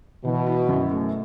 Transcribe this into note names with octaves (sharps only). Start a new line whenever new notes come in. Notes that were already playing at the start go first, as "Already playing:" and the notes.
B2 E3
E4
F#2
A3